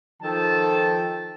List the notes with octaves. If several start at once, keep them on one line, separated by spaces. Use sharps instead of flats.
D#3 F3 A4 G5 A5